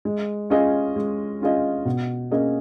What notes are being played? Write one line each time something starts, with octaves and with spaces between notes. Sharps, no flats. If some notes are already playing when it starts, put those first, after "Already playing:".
G#3
C#4 F4 G#4 D#5
G#3
C#4 F4 G#4 D#5
B2
A#3 C#4 G#4 D#5